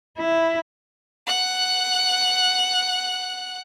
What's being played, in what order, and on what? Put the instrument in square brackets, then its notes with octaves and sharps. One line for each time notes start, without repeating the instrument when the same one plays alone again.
[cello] E4
[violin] F#5 F#6